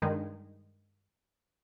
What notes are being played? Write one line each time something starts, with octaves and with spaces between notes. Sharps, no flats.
G2 D#3 G#3